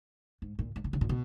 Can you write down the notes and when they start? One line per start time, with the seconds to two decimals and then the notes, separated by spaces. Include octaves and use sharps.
0.42 G#2
0.59 A#2
0.76 G#2
0.84 B2
0.93 C#3
1.01 A#2
1.09 B2